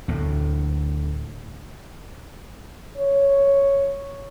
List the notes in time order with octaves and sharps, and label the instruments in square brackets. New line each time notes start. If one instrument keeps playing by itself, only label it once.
[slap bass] D2 A2
[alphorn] C#5